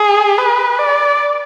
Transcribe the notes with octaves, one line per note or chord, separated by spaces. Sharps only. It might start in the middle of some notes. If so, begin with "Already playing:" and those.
Already playing: G#4
B4
D5